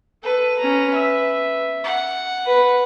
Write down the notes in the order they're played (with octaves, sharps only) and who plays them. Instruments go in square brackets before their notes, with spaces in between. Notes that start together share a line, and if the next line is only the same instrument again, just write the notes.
[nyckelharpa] A4 [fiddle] B4
[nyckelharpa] C#4 A#5
E5
[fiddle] F#5
[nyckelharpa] B4